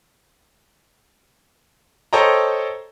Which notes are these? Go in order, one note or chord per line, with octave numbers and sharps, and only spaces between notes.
A4 C5 C#5 D#5 G5 A#5